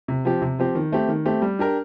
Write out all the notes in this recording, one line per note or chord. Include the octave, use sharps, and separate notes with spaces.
C3
F3 C4 G4
C3
F3 C4 G4
D#3
A3 C4 G4
D#3
A3 C4 G4
G3
D4 G4 A#4